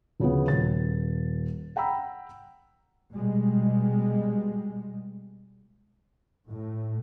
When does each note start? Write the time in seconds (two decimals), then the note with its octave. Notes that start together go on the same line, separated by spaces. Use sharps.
0.20 D2 C#3 F3 B3
0.47 D#1 A6
1.76 F#5 G5 A#5 B5 E6
3.12 B2 G3 G#3
6.48 A2